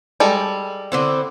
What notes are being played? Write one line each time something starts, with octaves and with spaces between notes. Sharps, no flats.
G3 G#3 A4
D3 C4 E4